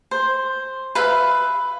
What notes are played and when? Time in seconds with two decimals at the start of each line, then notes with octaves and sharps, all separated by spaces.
0.11 C5
0.95 B4 E5 F5